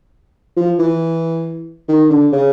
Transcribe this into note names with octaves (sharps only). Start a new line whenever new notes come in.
F3
E3
D#3
D3
C#3